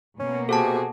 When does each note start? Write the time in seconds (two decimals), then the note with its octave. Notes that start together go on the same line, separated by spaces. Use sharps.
0.19 B2 A#3 C#4
0.49 C3 F#4 G#4 A4 A5